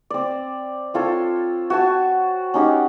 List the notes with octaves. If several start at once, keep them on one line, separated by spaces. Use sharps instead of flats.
C4 D5
C4 F4 A4 C#5
F#4 G#5 A5
C#4 D#4 G4 F#5